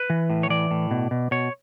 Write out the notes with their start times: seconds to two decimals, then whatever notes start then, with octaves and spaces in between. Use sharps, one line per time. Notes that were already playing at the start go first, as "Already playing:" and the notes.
Already playing: B4
0.10 E3
0.30 A2
0.43 C#5
0.50 E3 D5
0.71 A2
0.91 B2
1.11 B2
1.31 B2 C#5